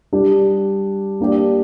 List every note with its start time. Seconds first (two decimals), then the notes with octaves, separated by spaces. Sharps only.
0.12 G3 D4 G4
1.20 A#3 D4 G4 D5